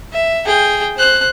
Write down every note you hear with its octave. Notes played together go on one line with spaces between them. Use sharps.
E5
G#4 G5
C5 F#6